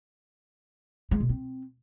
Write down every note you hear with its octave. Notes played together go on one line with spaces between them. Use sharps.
G#3
B2
C4